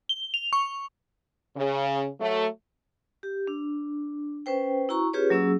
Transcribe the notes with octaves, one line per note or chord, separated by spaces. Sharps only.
G7
F7
C#6
C#3
F#3 A3
G4
D4
C#4 B4 C5 G5
E4 F#4 A#5 C#6
C#4 F4 G4 G#4 B4 C#5
F#3 A#3 C#4 F#4 G#4 E6